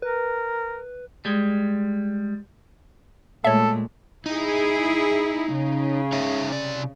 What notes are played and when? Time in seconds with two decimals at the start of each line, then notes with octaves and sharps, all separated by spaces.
0.02 A#4 B4
1.25 G3 G#3
3.44 A#2 G#3 A3 A4 C#5 E5
4.26 D#4 E4 G#4
5.53 C#3
6.12 D#4 C#5 E5
6.52 C3 D5